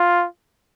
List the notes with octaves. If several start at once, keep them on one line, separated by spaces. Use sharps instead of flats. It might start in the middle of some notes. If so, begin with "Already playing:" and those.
Already playing: F4